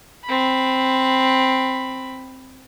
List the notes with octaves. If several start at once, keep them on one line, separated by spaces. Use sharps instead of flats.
C4 B5